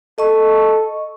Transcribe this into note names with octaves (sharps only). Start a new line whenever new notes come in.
A4 D#5 C#6